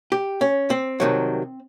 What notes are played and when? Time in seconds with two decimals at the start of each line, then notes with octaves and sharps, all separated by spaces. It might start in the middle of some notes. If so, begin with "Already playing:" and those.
0.12 G4
0.41 C#4
0.70 C4
1.00 C2 C3 D#3 F#3